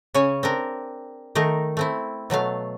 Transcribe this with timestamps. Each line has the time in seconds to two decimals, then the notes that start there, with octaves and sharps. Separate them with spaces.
0.14 C#3 C#4 C#5 G#5
0.43 C4 D4 A#4
1.35 D#3 A3 D#4 A#4
1.77 A3 C4 E4
2.30 B2 F#3 A3 F5